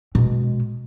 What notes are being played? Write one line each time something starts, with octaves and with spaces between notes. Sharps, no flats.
B2 G#3